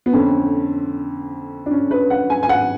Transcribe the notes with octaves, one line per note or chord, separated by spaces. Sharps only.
B3
F2 D3 C#4
D4
C#4
B4
F#5
G#5
G#5
F#5